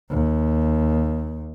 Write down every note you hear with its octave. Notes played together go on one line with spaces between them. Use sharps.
D#2